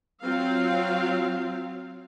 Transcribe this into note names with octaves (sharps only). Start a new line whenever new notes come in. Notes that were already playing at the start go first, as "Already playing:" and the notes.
F#3 C4 F4 F5